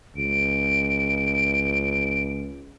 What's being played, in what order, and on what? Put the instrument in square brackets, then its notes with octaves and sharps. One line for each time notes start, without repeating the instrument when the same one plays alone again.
[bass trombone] C#2 [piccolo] D7